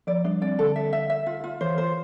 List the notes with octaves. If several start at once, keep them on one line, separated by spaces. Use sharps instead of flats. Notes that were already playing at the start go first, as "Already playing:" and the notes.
F3 D5
G3 D4
C4 D5
D3 A4
E5
E5
E5
F4
F4
E3 C5
C5